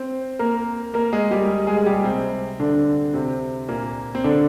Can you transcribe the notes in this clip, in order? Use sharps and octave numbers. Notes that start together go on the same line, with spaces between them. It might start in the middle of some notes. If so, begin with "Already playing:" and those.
Already playing: C4 C5
A#3 A#4
A#3 A#4
G#3 G#4
G3 G4
G#3 G#4
G#4
G3 G4
C3 C4
D3 D4
C3 C4
A#2 A#3
C4
D3 D4